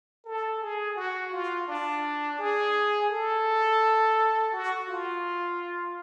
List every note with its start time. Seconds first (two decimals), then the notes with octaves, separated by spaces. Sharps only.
0.25 A4
0.61 G#4
0.96 F#4
1.32 F4
1.68 D4
2.39 G#4
3.10 A4
4.52 F#4
4.88 F4